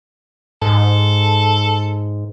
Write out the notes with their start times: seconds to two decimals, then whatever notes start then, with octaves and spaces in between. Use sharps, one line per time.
0.62 G#2 A4